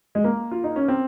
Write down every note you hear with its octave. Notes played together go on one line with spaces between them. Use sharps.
G#3
A#3
F4
D#4
C#4
C4